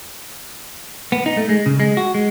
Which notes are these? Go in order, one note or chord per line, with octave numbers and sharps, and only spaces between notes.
B3
D#4
A3
G#3
C#3
G#3
F#4
G#3